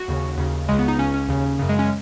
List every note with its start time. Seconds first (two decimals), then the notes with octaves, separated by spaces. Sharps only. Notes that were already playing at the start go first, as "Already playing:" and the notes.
Already playing: F#4
0.08 D#2 C#3
0.37 D#2 C#3
0.68 C#2 C#3 G#3
0.79 B3
0.88 D#4
0.98 C#2 C#3 C#4
1.14 C#4
1.28 D#2 C#3
1.59 F#2 C#3
1.69 G#3
1.79 C#4